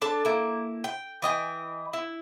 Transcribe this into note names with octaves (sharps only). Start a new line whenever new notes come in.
D4 A4 A5
A#3 E4
G5
E3 D#5 G5 G#5
E4